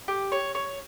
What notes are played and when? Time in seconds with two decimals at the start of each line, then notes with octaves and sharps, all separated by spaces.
0.08 G4
0.32 C#5
0.55 C#5